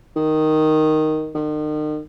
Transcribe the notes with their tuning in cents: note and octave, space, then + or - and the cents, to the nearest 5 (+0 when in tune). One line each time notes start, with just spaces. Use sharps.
D#3 +0
D#3 -40